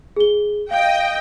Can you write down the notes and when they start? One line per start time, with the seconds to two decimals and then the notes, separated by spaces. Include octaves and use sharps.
0.16 G#4 G7
0.71 D#5 F5 G5